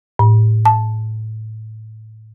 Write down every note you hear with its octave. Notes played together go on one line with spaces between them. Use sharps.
A2
A5